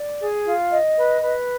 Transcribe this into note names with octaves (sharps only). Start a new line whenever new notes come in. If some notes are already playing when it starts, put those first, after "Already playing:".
Already playing: D5
G#4
F4
D#5
B4
B4